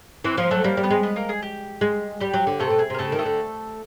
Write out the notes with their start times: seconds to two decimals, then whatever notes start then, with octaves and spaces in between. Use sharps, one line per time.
0.24 E3 C4 C5
0.37 F3 A#3 A#4
0.51 F#3 A3 A4
0.64 G3 A#3 A#4
0.77 G3
0.83 B3 B4
0.90 G#3
1.03 B3 B4
1.16 A#3 A#4
1.29 G#4
1.43 G4
1.81 G#3
2.20 G3 G4
2.34 F#3
2.47 D3
2.60 C3 A3 A4
2.70 B2
2.79 G#4
2.90 C3
2.94 A#4
2.98 C#3 A3 A4
3.12 D#3
3.19 A3 A4
3.25 D3